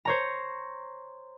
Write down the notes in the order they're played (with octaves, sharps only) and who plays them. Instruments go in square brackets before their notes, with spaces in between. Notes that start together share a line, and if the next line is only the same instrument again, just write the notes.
[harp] C5 C#5 A#5